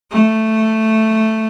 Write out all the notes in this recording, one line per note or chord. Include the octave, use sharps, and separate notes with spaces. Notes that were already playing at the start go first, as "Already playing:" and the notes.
A3